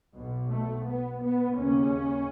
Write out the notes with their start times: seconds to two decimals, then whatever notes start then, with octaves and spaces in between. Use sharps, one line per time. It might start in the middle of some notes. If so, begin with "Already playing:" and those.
0.14 B1 B2
0.50 A3
0.85 B3
1.22 B3
1.57 D#2 C#3 C#4